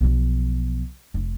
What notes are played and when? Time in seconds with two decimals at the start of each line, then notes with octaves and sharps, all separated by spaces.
0.01 B1 F3
1.14 F1